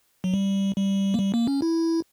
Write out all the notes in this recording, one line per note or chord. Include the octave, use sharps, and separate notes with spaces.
F#3
G3
G3
A#3
G3
A#3
C#4
E4